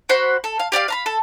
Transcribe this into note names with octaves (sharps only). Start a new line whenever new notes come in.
F#4 C5 F#5 B5
A4
F5
G4 D5 D#5 F5
F5 A#5 B5
A4